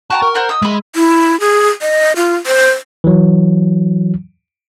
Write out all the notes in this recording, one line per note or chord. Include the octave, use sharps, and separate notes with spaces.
F#4 G5 A5 A#5
A#4
C5 F#5 A#5
D#5 D#6 E6
G#3 G#4 E5 B5
E4
G#4
D#5
F4
C5
E3 F#3